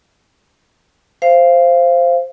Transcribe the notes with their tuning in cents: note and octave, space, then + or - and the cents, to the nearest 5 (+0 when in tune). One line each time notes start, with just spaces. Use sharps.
C5 +0 F5 -20